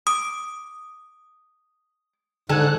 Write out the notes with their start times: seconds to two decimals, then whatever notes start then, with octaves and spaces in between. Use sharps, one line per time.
0.07 D6 D#6
2.49 G#2 D3 A4 G#5 F#6